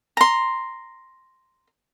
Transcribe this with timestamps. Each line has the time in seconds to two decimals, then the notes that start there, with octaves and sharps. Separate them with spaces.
0.17 A#5 C6